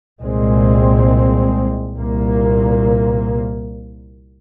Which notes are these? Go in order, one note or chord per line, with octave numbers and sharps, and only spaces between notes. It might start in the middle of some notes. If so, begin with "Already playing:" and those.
C2 A#2 G#3 C4
C2 A#2 A#3